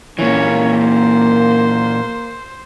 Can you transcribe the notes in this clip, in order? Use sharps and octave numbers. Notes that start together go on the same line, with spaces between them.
A#2 E3 A#3 C#4 C#5
C5